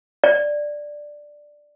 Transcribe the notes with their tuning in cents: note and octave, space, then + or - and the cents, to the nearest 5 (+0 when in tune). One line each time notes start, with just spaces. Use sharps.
D5 +5